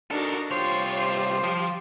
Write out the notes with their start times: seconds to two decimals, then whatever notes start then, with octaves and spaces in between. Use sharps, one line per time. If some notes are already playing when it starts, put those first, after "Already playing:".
0.11 D4 D#4 F#4 A4 A#4
0.51 C2 F4 G4 C5 C#5
0.97 C5
1.44 F3